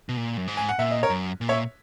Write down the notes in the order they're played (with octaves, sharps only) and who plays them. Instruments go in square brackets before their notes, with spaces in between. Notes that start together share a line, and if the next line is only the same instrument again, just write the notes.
[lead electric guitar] B2
A#2
F#2
G#2
[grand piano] G#5
F#5
[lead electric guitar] A#2 [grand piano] E5
[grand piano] D#5
A#4 C#5
[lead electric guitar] F#2
A#2
[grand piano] C#5 E5